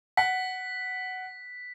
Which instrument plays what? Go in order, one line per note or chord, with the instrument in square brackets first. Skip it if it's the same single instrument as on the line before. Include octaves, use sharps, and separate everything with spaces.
[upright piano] F#5 [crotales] B6